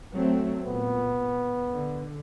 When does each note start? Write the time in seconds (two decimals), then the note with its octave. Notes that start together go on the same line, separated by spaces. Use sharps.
0.14 F#3 A3 C4
0.65 A#2 B3
1.72 D3